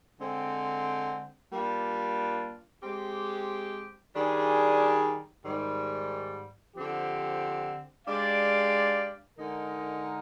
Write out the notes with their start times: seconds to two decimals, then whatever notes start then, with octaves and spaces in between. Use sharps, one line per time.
0.20 D3 G#3 C4
1.51 G3 A#3 D4 F4
2.83 G#3 C4 G4
4.14 D#3 G3 D4 G#4
5.44 G#2 D#3 G3
6.76 D3 F3 C4 G4
8.06 G#3 D4 G4 D5 F5
9.38 D3 G#3 D#4 A#4